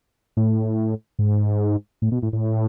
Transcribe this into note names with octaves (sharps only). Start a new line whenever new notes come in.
A2
G#2
A2
B2
A2
A2